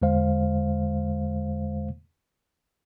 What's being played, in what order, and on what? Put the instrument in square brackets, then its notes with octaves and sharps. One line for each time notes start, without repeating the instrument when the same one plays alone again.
[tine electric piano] E2 D3 G#3 C5 F5